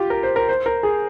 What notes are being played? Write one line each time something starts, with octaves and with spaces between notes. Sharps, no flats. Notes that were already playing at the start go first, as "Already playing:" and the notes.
Already playing: F4 G4
A#4
C5
A#4
C5
A#4
G#4